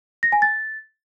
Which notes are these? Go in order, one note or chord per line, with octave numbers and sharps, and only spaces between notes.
A#6
G#5
A6